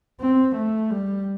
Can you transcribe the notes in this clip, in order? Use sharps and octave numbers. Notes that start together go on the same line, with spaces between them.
C4
A3
G3